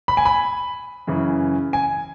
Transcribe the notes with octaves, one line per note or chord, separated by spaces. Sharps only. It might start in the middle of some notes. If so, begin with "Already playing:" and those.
B5
G#5
B5
F#2 C#3 E3
G#5